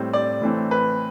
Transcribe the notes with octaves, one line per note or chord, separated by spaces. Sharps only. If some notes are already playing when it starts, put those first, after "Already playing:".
Already playing: A2 G3 C4
D5
A2 E3 A3 C4
B4